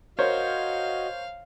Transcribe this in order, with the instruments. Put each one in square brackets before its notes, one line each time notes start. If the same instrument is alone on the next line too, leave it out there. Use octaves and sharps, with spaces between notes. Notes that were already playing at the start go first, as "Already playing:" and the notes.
[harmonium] F#4 D#5 [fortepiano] A#4 C5 C#5 [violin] F5